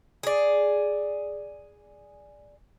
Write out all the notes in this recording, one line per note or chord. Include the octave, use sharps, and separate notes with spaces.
G#4 D5